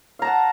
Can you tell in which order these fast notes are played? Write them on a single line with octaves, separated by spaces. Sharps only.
F5 A#5 A5 F#5